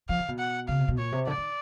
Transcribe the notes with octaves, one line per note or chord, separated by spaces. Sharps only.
F3 F5
D#3
B2
F#5
C#3 F5
C3
B2
A#2 C#5
C3
D3 D5
D#3